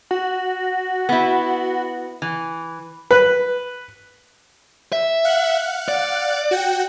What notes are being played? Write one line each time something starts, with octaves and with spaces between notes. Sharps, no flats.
F#4
B3 E4
E3
B4
E5
F5 F#5 F#6
D5
F#4 F#5 G5